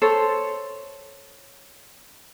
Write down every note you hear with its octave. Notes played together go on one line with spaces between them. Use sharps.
A4 C5 C#5